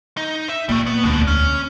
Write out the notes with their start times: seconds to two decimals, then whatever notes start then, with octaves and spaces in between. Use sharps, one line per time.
0.17 D#4
0.49 E5
0.69 A#2 G3 A3
0.87 B3
1.04 E1 D2 B2 D4
1.27 C#4